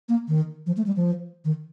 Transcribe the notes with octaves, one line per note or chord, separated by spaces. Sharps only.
A#3
D#3
F3
A3
G3
F3
D#3